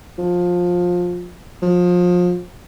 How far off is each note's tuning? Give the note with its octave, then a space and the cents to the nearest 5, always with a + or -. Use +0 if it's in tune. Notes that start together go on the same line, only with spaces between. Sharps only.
F3 +20
F3 +30